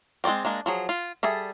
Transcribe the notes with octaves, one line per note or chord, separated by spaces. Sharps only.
G#3 C4 C5 D5 G5
G#3 A#3 D4
F3 F#3 G#4
F4
G3 G#4 A4 E5